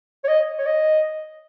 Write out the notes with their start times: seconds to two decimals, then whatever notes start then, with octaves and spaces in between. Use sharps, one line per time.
0.24 C#5
0.28 D#5
0.59 C#5
0.66 D#5